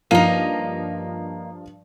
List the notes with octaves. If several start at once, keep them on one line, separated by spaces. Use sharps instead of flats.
G2 F3 A#3 D#4 D#7